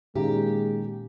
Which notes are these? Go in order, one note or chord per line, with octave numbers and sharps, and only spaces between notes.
A#2 D#3 G#3 C#4 G4 F5 A#5